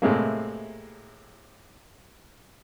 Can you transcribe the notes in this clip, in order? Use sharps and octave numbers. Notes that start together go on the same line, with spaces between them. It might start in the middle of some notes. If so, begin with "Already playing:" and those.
A2 C3 G#3 A#3